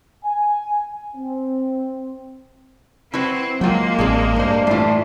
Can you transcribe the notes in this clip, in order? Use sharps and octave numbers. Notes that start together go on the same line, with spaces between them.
G#5
C4
C4 E4 F#4 B4
F#3 G#3 A#3 F4 G5
A1 C4 D4 G#4
G2 D4 C5
A2 E3 D4 F4